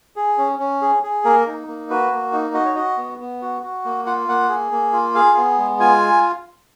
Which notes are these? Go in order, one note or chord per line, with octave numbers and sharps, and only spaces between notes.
G#4
C#4
C#4
G#4
G#4
A#3 A#4
D#4
A#3
F#4 B4
A#3
D#4
F#4 D#5
C#5
F#4 D#5
B3
B3
F#4
F#4
A#3
F4 F#5
A#3 F#5
G#4
A#3
F4
G#4 F5
B3
G#3
F4 G#5